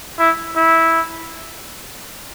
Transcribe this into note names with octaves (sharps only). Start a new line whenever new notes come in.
E4
E4